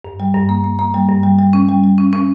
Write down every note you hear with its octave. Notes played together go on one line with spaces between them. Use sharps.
G2
G3
G2
A#3
A#3
A#3
G3
G2
G3
G3
C#4
G3
G3
C#4
C#4